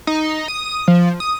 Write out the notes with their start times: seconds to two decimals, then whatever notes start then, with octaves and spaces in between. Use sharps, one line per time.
0.07 D#4
0.48 D#6
0.88 F3
1.20 D#6